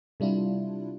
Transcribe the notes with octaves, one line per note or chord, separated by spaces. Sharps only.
C3 G3 D4 E4 F4